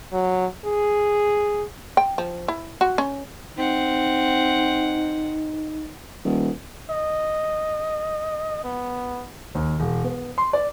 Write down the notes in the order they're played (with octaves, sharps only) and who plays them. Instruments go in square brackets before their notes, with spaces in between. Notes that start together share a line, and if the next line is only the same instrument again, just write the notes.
[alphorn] F#3
G#4
[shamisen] G5
F3
E4
F#4
C#4
[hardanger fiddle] C4 F#5 [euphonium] D#4
[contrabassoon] D#1
[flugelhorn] D#5
B3
[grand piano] D#2
E1
B3
C6
D5